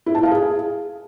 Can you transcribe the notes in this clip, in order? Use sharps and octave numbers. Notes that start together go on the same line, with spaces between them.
E4
A5
F5
G#4